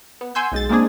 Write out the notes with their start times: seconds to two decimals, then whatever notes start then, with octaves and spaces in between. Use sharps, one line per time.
0.21 B3
0.35 F#5 G#5 C6 E6 G6
0.52 B1 G#3 A6
0.69 G#3 A#3 C4 D4 G#4